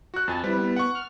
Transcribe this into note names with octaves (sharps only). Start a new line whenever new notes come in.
F#4 F#6
F2 G#5 A5 A6
G3 C4 E4 B4
B3
F#5 C#6
F6